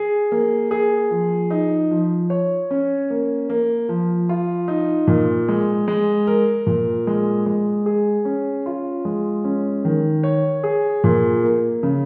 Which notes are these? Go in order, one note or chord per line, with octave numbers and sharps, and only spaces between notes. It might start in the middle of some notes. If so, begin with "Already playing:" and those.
Already playing: G#4
A#3
G#4
F3
D#4
F3
C#5
C#4
A#3
A#3
F3
F4
D#4
A#2
G#3
G#3
A#4
A#2
G#3
G#3
G#4
C#4
F4
G#3
C#4
D#3
C#5
G#4
A#2
A#3
C#3